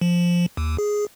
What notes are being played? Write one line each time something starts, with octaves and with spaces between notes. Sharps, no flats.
F3
D#2
G#4